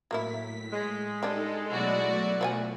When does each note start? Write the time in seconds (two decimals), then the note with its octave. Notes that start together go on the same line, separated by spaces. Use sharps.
0.11 A2 F#3 A#3 E4 B6
0.73 G#3
1.23 G3 D4 D#4 A4
1.69 B2 F#3 A3 E4 F#4 D5
2.41 F3 C#5 G#5